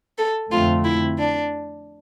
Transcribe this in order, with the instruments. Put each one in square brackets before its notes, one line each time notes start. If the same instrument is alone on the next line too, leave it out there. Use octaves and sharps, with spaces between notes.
[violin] A4
[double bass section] F2 D3 A3 C4 [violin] F4
[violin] E4
D4